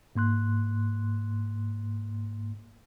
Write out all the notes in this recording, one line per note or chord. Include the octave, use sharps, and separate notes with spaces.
G#2 A#3 C6 F#6